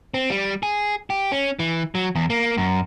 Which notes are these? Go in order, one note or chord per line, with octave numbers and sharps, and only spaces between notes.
C4
G3
G#4
G4
C#4
E3
F#3
E2
A#3
F#2